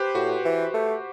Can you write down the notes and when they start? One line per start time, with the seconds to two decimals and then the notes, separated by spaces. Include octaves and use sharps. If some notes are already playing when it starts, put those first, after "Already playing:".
Already playing: G4 B4 C5
0.14 A2 F#4
0.45 E3
0.74 A3